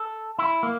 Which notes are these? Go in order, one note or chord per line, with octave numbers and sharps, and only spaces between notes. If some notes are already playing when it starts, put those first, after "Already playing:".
Already playing: A4
E4
A#3